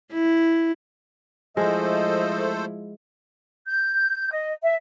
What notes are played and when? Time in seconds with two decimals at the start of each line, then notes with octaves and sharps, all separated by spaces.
0.12 E4
1.57 F3 G#3 A3 E4 A4 C5 D#5
3.66 G6
4.31 D#5
4.63 E5